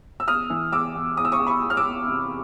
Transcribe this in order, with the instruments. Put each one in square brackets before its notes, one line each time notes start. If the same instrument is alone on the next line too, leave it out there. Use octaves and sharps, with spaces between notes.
[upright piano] E6
E2 D#6 F6
E3
E2 D6 E6
E2
E2 D#6
E6
C#6 D#6
E2
B5 C#6
E2
F6
D6 E6
E2
C3